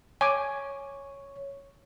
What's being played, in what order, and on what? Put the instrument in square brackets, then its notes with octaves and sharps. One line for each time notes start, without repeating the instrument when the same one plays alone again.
[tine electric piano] C#5 [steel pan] G#5 D6